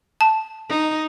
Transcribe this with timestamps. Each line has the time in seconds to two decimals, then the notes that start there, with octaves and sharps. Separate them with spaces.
0.21 A5
0.69 D#4